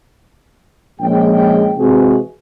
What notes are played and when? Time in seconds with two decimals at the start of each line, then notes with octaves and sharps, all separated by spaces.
1.00 A#1 G#3 C#4 G5
1.77 C3 E3 G#3 F#4 G#4